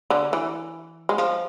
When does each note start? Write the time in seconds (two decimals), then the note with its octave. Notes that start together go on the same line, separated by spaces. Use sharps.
0.10 D3
0.33 E3
1.09 G#3
1.18 F3